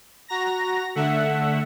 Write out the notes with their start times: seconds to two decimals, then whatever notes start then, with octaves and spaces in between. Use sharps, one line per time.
0.28 F#4 A#5 A#6
0.95 D3 A3 E5 F#5